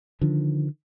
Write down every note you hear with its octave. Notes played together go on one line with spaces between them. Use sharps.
D3 D#3 F3